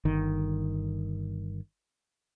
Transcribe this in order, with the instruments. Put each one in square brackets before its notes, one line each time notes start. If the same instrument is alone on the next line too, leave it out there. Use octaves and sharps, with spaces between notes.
[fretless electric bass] G1 D#3